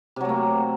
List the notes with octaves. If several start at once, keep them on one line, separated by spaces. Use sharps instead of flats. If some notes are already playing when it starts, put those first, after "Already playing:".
C3 F#3 A3 A#3